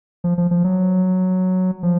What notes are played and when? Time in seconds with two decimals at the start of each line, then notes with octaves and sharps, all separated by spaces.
0.24 F3
0.38 F3
0.51 F3
0.64 F#3
1.83 F3